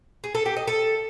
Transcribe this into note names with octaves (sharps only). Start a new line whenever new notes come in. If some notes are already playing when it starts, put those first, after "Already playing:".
G#4
A4
G4
D#5
A4